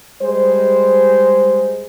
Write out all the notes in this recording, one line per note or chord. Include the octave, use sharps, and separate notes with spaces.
G3 G#3 C5